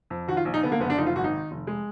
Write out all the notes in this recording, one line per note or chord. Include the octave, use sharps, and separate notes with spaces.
F2
D#3 F#4
F4
A#1
D#4
D3 B3
A#3
F#1 B3
D4
F3 D#4
F4
G#1 F#4
D#4
D#3
F1
G#3